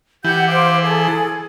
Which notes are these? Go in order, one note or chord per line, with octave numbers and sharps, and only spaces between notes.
E3 G4 F#5 G6
C5 F5 D6
G#4 A4